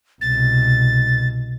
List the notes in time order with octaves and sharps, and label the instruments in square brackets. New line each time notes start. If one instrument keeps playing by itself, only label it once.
[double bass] C2 B2 [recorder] A6